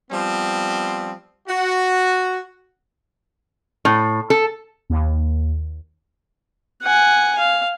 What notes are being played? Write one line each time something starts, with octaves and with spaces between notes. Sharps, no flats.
F3 G3 B3 C4
F#4
A2
A4
D#2
F#5 G#5
F5